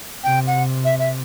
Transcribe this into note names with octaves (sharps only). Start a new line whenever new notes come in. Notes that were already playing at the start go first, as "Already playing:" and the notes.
C3 G5
F#5
E5
E5